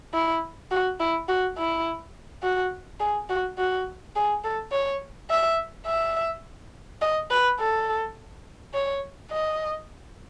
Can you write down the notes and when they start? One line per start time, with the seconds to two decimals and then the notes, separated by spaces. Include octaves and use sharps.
0.14 E4
0.71 F#4
1.00 E4
1.28 F#4
1.57 E4
2.43 F#4
3.00 G#4
3.29 F#4
3.58 F#4
4.15 G#4
4.44 A4
4.72 C#5
5.30 E5
5.86 E5
7.01 D#5
7.30 B4
7.59 A4
8.74 C#5
9.31 D#5